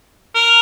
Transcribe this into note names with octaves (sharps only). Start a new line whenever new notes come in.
A#4